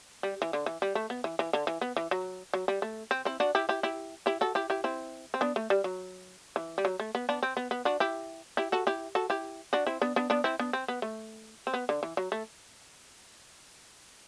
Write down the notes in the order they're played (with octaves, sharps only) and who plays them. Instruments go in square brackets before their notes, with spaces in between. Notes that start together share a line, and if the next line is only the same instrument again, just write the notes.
[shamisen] G3
E3
D3
E3
G3
A3
B3
E3
E3
D3
E3
B3
E3
F#3
F#3
G3
A3
C4
C4 E4
D4 F#4
E4 G4
E4 G4
E4 G4
E4 G4
F#4 A4
E4 G4
E4 G4
C4 E4
C4
B3 D4
A3
G3
F#3
E3
G3
F#3
A3
B3
B3 D4
C4
B3
B3
D4 F#4
E4 G4
E4 G4
F#4 A4
E4 G4
F#4 A4
E4 G4
D4 F#4
C4 E4
B3 D4
B3 D4
B3 D4
C4 E4
B3 D4
C4
B3
A3
C4
B3
D3
E3
F#3
A3